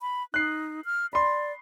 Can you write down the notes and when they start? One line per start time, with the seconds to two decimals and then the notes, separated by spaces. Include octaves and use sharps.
0.01 B5
0.34 D#4 F#6 C7
0.85 F6
1.13 D5 B5 C6